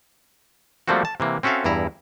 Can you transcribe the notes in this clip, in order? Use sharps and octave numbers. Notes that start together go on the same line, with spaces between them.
F3 G3 A3 A#3 C4 F#4
A5
C3 E3 A#3
C4 C#4 F#4 A4 E5 F5
E2 G2 E4 A#5